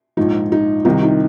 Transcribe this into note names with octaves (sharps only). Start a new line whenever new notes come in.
A#1 G#2 F3 D#4
D#4
C2 C3 D#3 D#4
D#4